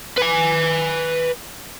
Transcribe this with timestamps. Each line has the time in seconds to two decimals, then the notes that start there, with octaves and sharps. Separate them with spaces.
0.17 B4 G#5